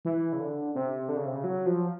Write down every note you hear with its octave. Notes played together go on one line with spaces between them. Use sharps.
E3
C#3
D3
C3
D3
C#3
C3
C#3
F#3
F3